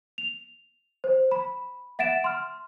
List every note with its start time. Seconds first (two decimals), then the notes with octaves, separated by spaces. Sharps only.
0.18 F7
1.04 C5
1.31 B5
1.99 E5 F#5 A6 D7 E7
2.24 C6 F6